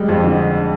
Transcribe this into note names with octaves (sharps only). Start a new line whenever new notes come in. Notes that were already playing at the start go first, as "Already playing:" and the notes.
Already playing: G3 G#3
F2
D3